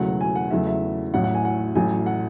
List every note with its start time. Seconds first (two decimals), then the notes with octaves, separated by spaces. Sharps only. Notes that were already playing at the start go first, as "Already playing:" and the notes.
Already playing: E1 E2 C#3 F#3 A3 F#5
0.21 G#5
0.36 F#5
0.51 E2 C#3 F#3 A3 E5
0.67 E5
1.14 A1 A2 F#3 F#5
1.24 F#5
1.35 G#5
1.45 F#5
1.75 A1 A2 F#3 A3 G#5
2.06 F#5